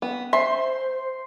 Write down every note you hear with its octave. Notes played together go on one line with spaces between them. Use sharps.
B3
C5 E5 C6